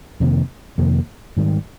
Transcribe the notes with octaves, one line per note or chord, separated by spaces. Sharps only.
F2 C3 D#3 A#3
F2 C3 D#3 A#3
G#2 D#3 G3